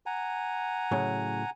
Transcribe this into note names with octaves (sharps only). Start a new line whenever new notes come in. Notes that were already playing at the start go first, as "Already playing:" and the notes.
F#5 G#5 A#5
A2 C#3 F#3